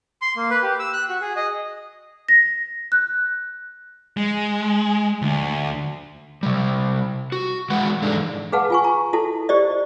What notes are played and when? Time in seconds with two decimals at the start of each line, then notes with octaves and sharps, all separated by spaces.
0.22 C6
0.36 A#3
0.50 B4
0.62 G4
0.79 E6
0.93 F#6
1.09 F#4
1.21 G#4
1.36 D#5
2.28 A#6
2.92 F#6
4.17 G#3
5.22 D2
6.43 C3 G3
7.32 F#4
7.70 E3 G#3 G#4 B4 F#5
8.02 G#2 E3 G#3 D4 D#4 A4
8.52 G#4 B4 F5 F#5 A5
8.70 F4 G#5 C#6
8.84 A#5
9.13 E4 F#4 A4 A5
9.49 G4 C5 D5 D#5